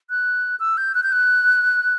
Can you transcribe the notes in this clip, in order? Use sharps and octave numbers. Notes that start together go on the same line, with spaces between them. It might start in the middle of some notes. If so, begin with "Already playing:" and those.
F#6
E6
G6
F#6
G6
F#6